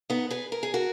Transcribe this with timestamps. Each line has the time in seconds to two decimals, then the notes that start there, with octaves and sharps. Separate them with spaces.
0.10 B3 D#4
0.30 G#4 B4
0.52 A#4
0.63 G#4
0.74 F#4 A#4